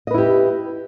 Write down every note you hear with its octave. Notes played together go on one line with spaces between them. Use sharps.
E4 G4 B4 D#5